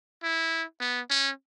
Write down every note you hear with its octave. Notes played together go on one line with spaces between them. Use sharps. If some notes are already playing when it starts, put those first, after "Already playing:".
E4
B3
C#4